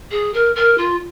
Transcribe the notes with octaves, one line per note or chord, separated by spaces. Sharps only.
G#4
A#4
A#4
F4